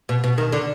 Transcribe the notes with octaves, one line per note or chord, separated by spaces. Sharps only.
B2
B2
D#3
D3